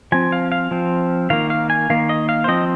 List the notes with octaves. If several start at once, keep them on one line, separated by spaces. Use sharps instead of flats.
F3 C4 G#5
F5
F5
F3 C4
D#3 A#3 F5
F5
G#5
D#3 A#3 F5
D#5
F5
C5
F3 C4 D#5